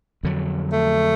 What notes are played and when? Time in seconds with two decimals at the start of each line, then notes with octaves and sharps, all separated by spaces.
0.23 F2 D3 F#3
0.72 A3